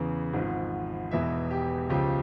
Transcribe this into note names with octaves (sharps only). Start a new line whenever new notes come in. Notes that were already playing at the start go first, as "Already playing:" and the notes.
Already playing: E2 C#3 E3
G#1 G#2 F3
E1 E2 E3 E5
G4
C#2 C#3 F3 G4